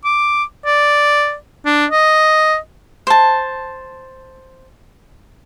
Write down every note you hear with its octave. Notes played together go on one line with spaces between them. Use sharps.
D6
D5
D4
D#5
C5 A5